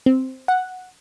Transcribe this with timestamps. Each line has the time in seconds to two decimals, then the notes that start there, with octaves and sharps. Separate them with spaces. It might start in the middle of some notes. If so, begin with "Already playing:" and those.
0.06 C4
0.48 F#5